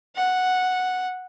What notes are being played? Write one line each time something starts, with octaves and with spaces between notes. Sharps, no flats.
F#5